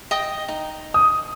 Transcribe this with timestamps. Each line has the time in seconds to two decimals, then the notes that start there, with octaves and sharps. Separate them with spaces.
0.11 D#5 G5 D#6
0.48 D#4
0.94 D#6